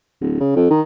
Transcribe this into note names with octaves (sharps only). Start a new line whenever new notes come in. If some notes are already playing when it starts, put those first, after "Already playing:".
D1
C#3
F2
D#3